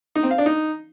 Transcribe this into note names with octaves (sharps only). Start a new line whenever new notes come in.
D#4
C4
F5
D4
D#4